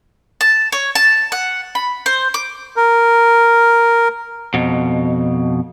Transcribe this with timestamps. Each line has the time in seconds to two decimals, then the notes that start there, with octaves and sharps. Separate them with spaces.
0.41 A5
0.72 C#5
0.95 A5
1.32 F#5
1.75 B5
2.06 C5
2.34 D6
2.76 A#4
4.54 F2 B2